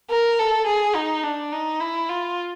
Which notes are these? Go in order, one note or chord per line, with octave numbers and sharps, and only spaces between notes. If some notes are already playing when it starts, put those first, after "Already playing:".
A#4
A4
G#4
D#4
D4
D#4
E4
F4